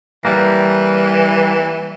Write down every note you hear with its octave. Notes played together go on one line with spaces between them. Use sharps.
E3 G3 A#3